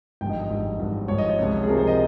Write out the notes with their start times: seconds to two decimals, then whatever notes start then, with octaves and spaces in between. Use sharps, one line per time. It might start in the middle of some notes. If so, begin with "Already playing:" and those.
0.21 G#1 G2 F3 G5
0.30 D#5
0.41 D#5
0.50 G#1 G2 F3
0.79 G#1 G2 F3
1.08 G#1 G2 F3 C#5
1.18 D#5
1.29 C#5
1.38 C#2 C3 F3
1.63 G#4
1.68 C#2 C3 F3 A#4
1.78 C5
1.87 D#5